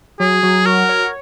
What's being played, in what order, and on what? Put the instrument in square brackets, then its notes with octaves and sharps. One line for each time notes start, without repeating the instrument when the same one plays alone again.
[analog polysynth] F#3 [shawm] G#4
[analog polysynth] F#3
[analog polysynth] F#4 [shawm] A#4
[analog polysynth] C#5